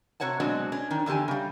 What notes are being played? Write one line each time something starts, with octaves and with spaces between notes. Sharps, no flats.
C3 F#4 C#5 F#5 A5
B2 F#3 G#3 C4 D4 F#4
C#4 D4
D#3 D4
E2 D3 F4 G4 G#5
C#3 G3